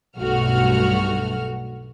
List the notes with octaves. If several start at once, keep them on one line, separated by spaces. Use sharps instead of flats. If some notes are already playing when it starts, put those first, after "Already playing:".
B1 G2 A3 F#4 F6